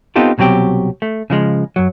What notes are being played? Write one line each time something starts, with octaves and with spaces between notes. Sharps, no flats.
B3 C4 D#4 F4 G4 A4
C2 B2 F#3 C4 G4
A3
C#3 F3 G#3
F#2 F#3